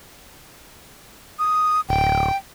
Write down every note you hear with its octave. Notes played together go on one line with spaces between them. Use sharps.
D#6
D1 G5